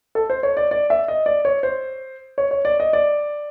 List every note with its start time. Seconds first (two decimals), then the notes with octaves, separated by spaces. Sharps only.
0.15 A4
0.30 C5
0.43 C#5
0.57 D5
0.71 D5
0.90 E5
1.08 D#5
1.26 D5
1.45 C#5
1.63 C5
2.38 C#5
2.51 C#5
2.65 D5
2.80 D#5
2.93 D5